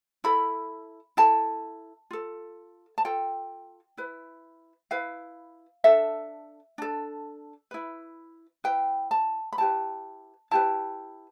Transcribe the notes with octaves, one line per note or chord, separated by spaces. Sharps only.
E4 A4 B5
E4 A4 A5
F4 A4
A5
F4 A4 G5
E4 B4
E4 B4 F5
D4 A4 E5
D4 A4
E4 B4
E4 B4 G5
A5
B5
E4 G4 B4 A5
E4 G4 B4 A5